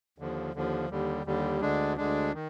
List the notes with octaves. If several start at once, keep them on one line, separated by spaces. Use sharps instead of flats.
D#2 D3 F3
D#2 D3 F3
D#2 D3 G3
D#2 D3 G3
D2 D3 G#3 D4
D2 D3 G#3 D4
D#3